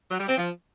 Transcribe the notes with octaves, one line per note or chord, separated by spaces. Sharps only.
F#3
G3
C4
F3